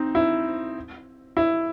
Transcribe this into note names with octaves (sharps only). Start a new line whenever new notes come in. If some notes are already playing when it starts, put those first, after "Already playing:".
Already playing: C4 D#4
E4
E4